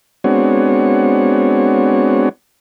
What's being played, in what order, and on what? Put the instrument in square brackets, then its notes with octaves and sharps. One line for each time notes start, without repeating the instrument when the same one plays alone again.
[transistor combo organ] G#3 B3 C4 D4 F#4 C#5